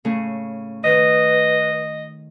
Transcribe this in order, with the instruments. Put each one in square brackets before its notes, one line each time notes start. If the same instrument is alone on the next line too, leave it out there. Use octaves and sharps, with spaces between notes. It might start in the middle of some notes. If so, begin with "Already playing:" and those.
[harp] A2 C#3 A3
[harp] D#3 [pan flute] B4 [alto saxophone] D#5